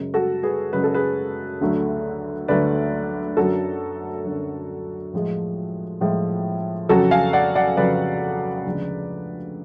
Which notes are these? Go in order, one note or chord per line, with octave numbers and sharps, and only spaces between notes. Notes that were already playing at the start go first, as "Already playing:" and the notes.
Already playing: F#2 C#3 G#3
F#4 A4
G#4 B4
F#2 C#3 G#3 B4
A4
G#4 B4
D2 D3 F#3 A3
D2 D3 F#3 A3 B4 D5
F#2 D3 F#3 F#4 A4
F#2 D3 F#3
A2 F3 G#3
A2 F3 G#3
F2 C#3 F#3 F#4 A4
F5 G#5
D5 F#5
D5 F#5
F2 C#3 F#3 B4 D5
D2 C#3 F3 G#3